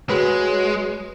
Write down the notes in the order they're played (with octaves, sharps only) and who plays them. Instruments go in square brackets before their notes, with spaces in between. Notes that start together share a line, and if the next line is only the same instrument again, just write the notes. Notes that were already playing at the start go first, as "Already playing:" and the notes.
[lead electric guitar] G#3 [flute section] F#4 C#5 [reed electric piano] G#4 B4